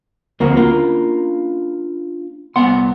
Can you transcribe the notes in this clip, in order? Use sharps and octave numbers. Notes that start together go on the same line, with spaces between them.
D2 F3 A#3 C4 F#4
A#3 C#4 D4 F4
C2 A#2 B3 F#5 G#5 C6